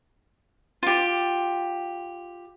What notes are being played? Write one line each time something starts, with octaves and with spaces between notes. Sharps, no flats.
F4 G4